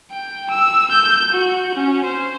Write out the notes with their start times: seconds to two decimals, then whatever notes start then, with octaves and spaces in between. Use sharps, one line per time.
0.11 G5
0.50 E6
0.91 G6
1.31 F#4
1.74 C#4
2.04 C5